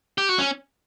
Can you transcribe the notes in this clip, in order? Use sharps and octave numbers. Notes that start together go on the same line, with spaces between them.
G4
F#4
C#4